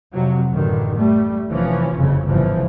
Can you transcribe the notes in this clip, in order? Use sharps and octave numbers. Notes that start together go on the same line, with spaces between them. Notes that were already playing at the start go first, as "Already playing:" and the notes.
F2 C3 F#3
A1 F#2 D3 D#3
G3 A3
F1 C3 E3 F3 C#4
F#1 F2 C#3
G1 C2 G#2 C#3 E3 F3